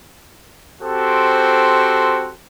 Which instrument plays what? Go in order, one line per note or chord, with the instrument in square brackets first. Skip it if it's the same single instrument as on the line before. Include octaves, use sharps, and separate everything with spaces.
[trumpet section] C4 F#4 G4 A4 C5